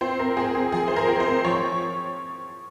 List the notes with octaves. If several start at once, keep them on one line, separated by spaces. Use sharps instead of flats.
C4 C5
A#4
C4 G#4
G#4
F3 G#4
C5
A#4
C4
C5
F3 C#5